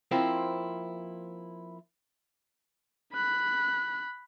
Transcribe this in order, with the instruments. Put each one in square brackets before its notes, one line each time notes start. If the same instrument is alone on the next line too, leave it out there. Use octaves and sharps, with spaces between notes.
[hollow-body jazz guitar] F3 A#3 C4 E4
[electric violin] B5 F#6